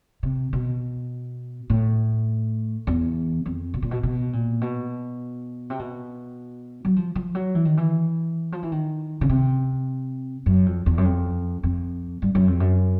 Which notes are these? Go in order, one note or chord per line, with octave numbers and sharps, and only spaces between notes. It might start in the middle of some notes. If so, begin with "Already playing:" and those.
C3
B2
A2
E2
F2
B2
A#2
B2
B2
A#2
B2
C3
B2
F#3
F3
F3
F#3
E3
D#3
E3
F3
E3
D#3
C#3
C3
F#2
F2
E2
F#2
F2
F2
G2
F#2
F2
F#2